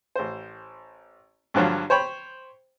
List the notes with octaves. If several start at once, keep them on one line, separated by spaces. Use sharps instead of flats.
A1 C5
G2 D3 F3 F#3
C5 C#5 G5 B5